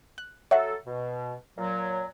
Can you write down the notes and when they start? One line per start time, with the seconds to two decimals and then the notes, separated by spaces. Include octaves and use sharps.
0.18 F#6
0.51 F#3 A4 C#5 E5 F#5
0.86 B2
1.58 A#2 F#3